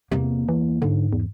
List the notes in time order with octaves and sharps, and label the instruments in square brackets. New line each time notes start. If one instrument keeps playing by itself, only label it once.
[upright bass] E2 A#3 [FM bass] C3
[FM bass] E3
[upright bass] G#2 [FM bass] D3
[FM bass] E2